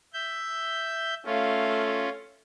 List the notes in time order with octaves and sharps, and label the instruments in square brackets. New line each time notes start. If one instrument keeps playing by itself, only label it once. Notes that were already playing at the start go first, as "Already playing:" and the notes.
[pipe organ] E5 G6
[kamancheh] A3 F5 [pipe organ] C#4 F4